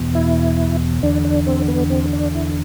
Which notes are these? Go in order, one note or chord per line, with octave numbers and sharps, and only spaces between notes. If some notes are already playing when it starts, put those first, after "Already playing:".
Already playing: E2 B2
E4
E2 D3 D4
D4
C4
B3
C4
D4
E4